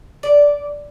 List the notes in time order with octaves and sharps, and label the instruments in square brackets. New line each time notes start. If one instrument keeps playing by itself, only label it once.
[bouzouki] D5